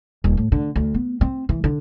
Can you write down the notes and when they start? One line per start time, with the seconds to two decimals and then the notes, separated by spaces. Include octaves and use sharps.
0.24 D#1
0.37 A2
0.52 D3
0.76 D2
0.94 B3
1.21 C4
1.49 E3
1.64 D3